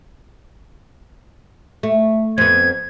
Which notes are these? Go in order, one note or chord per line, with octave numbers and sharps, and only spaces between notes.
A3
F2 B3 G#6